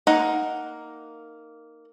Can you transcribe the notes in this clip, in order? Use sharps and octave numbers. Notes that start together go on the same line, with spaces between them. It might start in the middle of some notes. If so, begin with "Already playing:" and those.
A#3 D#4 F#5